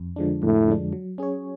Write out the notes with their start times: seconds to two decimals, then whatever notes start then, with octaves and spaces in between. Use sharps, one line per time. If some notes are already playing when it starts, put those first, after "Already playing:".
Already playing: F2
0.16 D3 F3 G#3 D4
0.42 F2 A2
0.68 D3 F3 G#3 D4
0.93 F#3
1.18 C#4 G#4 C#5